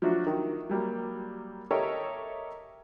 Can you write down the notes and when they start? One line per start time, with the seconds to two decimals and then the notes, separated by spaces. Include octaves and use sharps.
0.02 F3 F#3 A3 D4 F#4
0.26 D#3
0.69 F#3 G3 A#3
1.71 G4 A4 A#4 C#5 D#5 E5